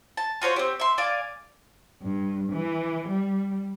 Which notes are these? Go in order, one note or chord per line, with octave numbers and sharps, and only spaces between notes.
A5
F4 F#4 C5 C#5
C4 G4
E5 C6
D5 F5 G#5 D6
G2
E3
G3